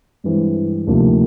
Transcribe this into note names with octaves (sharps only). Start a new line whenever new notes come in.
G2 E3 G#3 C4
D2 C3 F3 A#3 D#4